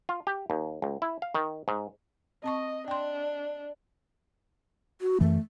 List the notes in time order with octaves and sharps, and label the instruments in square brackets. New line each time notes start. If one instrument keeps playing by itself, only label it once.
[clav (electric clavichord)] F4
G4
D#2
C#2
E4
F5
D#3
G#2
[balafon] C4 A5 C#6 [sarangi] D#5
[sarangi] D4 [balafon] G5 C6
[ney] F#4
[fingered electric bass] F#2 E3 [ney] A3